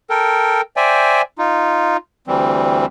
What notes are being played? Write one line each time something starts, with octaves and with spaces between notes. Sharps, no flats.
A4 A#4 G5
C5 D5 E5 G5 G#5
D#4 F4
D2 E3 G3 C4